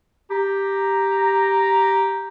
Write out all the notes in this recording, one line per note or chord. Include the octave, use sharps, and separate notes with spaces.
G4 A#5